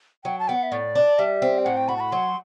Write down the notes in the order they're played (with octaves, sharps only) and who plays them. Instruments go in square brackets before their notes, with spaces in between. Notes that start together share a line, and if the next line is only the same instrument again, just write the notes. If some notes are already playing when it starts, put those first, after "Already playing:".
[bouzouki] F#3 [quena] G5
[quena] A5
[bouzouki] B3 [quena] G5
[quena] F#5
E5
[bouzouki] A2 [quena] D5
[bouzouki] D4
[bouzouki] G3 [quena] E5
[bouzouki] C4
[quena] G5
[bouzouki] A2 [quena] F#5
[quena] G5
[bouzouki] F#4 [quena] B5
[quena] A5
B5
[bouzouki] F#3 [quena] C6